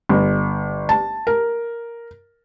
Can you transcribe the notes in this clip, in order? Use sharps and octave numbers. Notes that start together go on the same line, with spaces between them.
G1
A5
A#4